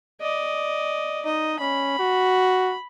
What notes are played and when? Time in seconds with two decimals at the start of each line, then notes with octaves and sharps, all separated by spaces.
0.21 D5 D#5
1.25 D#4 D#5
1.60 C#4 B5
1.99 F#4